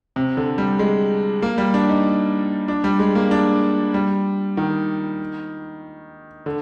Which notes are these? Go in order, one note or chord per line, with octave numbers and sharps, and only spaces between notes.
C3
D3
G3
G#3
A#3
G3
D4
D#4
D4
G3
G#3
A#3
D4
G3
D#3
D3